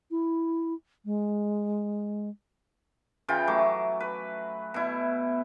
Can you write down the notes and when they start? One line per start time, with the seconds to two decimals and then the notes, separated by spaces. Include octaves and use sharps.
0.11 E4
1.05 G#3
3.28 C#3 E3 F4 G5
3.48 F#3 A3 D6
4.00 B4
4.74 B2 E4